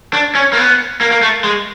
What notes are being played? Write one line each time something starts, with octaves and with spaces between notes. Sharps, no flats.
D4
C#4
A#3
B3
A#3
A#3
A3
G#3